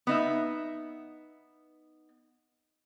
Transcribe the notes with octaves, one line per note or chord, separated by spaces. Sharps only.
B3 D#4 E5